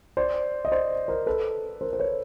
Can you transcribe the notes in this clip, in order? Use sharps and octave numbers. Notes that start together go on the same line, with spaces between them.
C5 D5
D#5
C5 D5
A#4 C5
A4 B4
A#4 C5
C5
B4 C#5